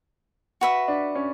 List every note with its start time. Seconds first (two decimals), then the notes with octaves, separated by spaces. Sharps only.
0.61 F#4 B4 E5
0.88 D4
1.15 C#4